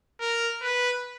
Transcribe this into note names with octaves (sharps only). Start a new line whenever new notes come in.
A#4
B4